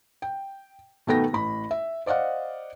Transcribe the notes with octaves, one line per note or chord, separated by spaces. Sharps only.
G5
B2 D#3 A3 B3 G5 A#6
A1 B5
E5
C5 D5 D#5 F5 F#5